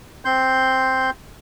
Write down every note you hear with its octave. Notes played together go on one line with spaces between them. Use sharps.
C4 C6 G6